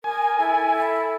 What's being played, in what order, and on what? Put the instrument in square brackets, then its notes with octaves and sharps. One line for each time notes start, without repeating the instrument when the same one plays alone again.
[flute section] A#4 D#6 [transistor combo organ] G#5
[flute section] E4 A4